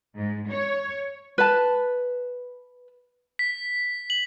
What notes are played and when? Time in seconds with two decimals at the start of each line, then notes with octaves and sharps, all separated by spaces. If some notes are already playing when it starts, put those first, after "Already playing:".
0.15 G#2
0.49 C#5
1.38 B4 A5
3.39 B6
4.10 F#7